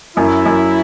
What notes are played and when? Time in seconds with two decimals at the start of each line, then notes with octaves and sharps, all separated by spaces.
0.17 F#2 E4
0.46 F#2